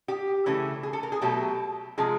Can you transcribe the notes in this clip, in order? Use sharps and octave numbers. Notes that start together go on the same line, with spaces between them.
G4
C#3 E3 A3
G#4
A4
A#4
G#4
B2 F#3 A3 G4
C3 F3 G#3 G#4